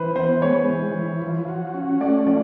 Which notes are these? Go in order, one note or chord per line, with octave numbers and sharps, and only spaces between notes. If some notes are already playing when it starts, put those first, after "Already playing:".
Already playing: E3 B4 C5
B3 C5
G#3 C#5
E3
E3
F3
F#4
C#4
A3 D5
F3 D5